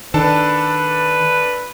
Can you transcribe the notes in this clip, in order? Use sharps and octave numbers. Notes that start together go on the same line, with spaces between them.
D#3 D4 A4 B4 A5